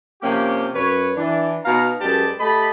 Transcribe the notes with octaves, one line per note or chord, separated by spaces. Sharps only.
C3 F3 A#3 C#4 G4
F#2 B4 C#5
E3 D4
B2 D#4 F5 A#5
F#2 G#3 G4 B4 D5 A5
A3 G4 D#5 A5 B5